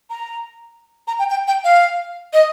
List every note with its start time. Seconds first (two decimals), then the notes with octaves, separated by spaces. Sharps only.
0.10 A#5
1.08 A#5
1.19 G5
1.30 G5
1.48 G5
1.64 F5
2.33 D#5